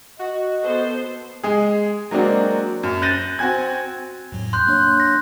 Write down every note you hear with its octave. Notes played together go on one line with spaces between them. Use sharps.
F#4 D#5
B3 A4 C5
G#3 G#4
F#3 G#3 A#3 C4 D4 F#4
F#2
F#6 G6 A6 A#6 D#7
C4 F#4 G#5 G#6
F2 A2 F#3
C6 F#6 G6
A#3 D4 C#5
A#6